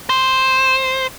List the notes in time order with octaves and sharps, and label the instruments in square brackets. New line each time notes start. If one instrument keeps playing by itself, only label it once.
[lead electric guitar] C5